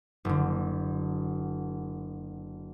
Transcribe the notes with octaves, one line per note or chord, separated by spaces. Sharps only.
F#1 D3